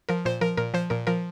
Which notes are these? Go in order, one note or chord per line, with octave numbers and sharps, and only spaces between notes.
F3 A#4
A#2 C5
F3 A#4
A#2 A#4
F3 C5
A#2 A#4
F3 A#4